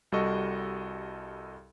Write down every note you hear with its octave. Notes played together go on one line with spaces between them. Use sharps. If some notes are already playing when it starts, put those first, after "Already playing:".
C2 G3 F#4 A4 D#5 C#6